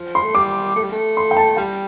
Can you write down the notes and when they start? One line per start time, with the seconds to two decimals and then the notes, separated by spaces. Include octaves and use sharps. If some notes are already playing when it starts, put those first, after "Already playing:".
Already playing: F3
0.15 C6
0.23 A3
0.35 G3 D6
0.76 A3
0.84 G3
0.92 A3
1.17 C6
1.31 G5
1.37 A5
1.57 G3 G5